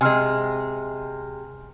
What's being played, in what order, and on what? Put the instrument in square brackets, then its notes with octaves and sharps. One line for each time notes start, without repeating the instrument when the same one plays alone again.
[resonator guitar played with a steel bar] C3 G#3 [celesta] G#5 C6 F6